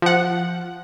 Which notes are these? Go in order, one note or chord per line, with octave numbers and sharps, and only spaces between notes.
F3 F#5